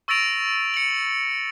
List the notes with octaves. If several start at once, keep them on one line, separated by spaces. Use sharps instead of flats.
C#6 E6 A6 A#6 D7 F7
C#7 F#7